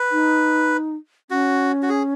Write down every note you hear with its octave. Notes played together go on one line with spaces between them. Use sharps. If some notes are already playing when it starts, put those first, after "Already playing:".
Already playing: B4
D#4
C#4 F#4
F#4
G#4